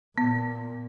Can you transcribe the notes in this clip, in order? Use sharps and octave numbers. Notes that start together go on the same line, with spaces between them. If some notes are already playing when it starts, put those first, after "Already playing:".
A#2 B3